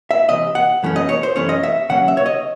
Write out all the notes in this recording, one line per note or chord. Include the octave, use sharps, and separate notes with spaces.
E5
C#2 C3 E3 D#5
F#5
F#2 E3 A3 C#4
D#5
C#5
C5
F#2 E3 A3 C#4 C#5
D#5
E5
D#2 C#3 F#3 C#4 F#5
E5
C#5
D#5